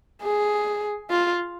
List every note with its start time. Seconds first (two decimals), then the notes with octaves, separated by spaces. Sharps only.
0.23 G#4
1.10 F4